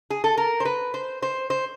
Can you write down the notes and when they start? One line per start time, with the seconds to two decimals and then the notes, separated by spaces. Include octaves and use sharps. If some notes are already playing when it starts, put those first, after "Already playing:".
0.10 G#4
0.24 A4
0.38 A#4
0.60 C5
0.65 B4
0.94 C5
1.22 C5
1.50 C5